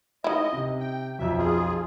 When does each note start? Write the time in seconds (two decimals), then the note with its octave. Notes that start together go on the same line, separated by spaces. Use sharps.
0.24 D#4 E4 D#5
0.53 C3
0.80 G5
1.19 B1 F2 E5
1.38 F4 G#4